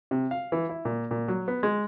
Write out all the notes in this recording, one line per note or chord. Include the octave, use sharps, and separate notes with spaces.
C3
F5
E3
E4
A#2
A#2
F#3
B3
G#3